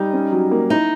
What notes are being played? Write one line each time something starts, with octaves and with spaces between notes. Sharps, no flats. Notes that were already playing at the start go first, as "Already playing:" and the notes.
Already playing: G3 D#4
C#4
F#3
A#3
D#4 E4